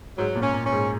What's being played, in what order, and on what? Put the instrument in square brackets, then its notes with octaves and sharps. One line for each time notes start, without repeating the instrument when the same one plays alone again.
[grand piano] G#2 [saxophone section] F#3
[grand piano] A#2
[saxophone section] C#4
[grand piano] A#2
[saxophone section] C#4
[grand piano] G#2